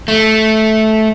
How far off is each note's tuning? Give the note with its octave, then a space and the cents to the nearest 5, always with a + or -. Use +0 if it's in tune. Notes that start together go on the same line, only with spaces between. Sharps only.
A3 -10